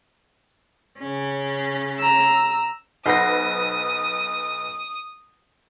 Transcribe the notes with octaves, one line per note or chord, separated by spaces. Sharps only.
C#3 C#4
A#5 E6
B1 B4 C5 F#5 D#6 A#6